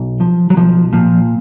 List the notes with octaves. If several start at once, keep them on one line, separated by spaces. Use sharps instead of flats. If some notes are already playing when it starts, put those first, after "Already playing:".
Already playing: B1
F3
F#3
B1 F3
A#2 F3